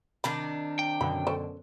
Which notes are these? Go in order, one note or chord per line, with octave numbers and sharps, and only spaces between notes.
C3 D#3 D4 B5
G5
F#2 B2 D3 B5
C#4 A4 C5